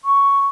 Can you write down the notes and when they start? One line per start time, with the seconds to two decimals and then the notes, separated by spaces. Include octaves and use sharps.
0.05 C#6